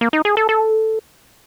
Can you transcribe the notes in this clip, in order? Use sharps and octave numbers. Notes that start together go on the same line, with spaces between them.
A#3
D#4
G#4
A4
A4